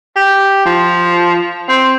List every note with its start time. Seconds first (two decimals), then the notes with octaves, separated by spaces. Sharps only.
0.16 G4
0.65 F3
1.68 C4